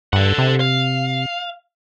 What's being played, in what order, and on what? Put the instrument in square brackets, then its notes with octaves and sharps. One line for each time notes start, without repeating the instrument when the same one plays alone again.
[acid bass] G2 [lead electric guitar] A4 F#5
[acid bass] C3
[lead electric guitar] F5